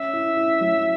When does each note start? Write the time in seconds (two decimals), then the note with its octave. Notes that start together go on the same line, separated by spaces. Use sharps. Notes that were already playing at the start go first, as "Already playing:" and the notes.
Already playing: C#4 E5
0.13 E4
0.37 E4
0.61 F#3